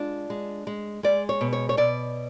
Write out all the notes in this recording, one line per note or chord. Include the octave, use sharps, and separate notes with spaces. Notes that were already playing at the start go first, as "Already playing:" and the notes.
Already playing: G#3 D4 F4
G#3
G#3
G#3 D5
C#5
B2
C#5
C#5
B2 D5